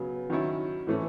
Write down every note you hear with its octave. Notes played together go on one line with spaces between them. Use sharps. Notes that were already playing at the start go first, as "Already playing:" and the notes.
Already playing: C#3 F#3 B3
D#3 F#3 C#4 E4
A2 E3 A3 C#4